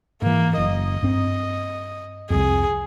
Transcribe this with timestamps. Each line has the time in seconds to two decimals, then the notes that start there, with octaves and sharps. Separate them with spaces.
0.22 G#2 E3 A#3
0.58 F#1 D#5
1.03 G2 C4
2.30 C2 F2 G#4